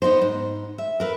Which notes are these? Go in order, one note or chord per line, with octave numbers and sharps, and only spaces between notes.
B3 D#4 F#4 C5
G#2
E5
A#4 B4 E5